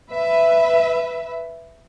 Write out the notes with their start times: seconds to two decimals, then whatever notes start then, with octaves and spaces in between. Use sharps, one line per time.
0.11 B4 E5